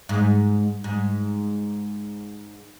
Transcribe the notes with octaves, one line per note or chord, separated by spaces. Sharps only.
G#2
G#2